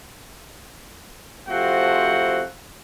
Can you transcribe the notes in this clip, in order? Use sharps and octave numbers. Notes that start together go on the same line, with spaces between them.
C3 F3 A3 C4 F#4 F#5